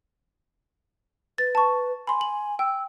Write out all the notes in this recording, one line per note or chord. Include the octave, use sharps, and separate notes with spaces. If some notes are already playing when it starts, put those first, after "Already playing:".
B4 A6
A5 C#6
G#5 B5 C6
F#7
G5 E6